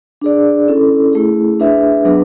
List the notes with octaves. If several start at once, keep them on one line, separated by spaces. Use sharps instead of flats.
D4 G#4 D5
C#4 E4 A4
A3 E4 G#4
D4 G#4 B4 E5
F#3 B3 D4 G#4 B4